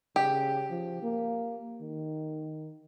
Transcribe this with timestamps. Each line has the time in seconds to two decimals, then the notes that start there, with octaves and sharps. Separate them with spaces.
0.16 C#3 G4
0.70 F3
1.03 A#3
1.81 D#3